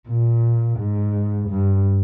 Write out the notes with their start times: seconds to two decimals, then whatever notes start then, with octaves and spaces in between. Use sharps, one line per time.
0.08 A#2
0.78 G#2
1.49 G2